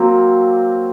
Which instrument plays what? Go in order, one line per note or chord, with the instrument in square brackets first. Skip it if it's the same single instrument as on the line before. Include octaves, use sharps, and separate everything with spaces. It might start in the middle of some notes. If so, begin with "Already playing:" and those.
Already playing: [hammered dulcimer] F#3 A#3 C4